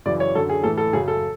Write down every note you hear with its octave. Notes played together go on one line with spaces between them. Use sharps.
F#2 C#3 E3 D5
C#5
F#2 D3 F#3 A4
G#4
A2 E3 A4
A4
F#2 C#3 F#3 G#4
A4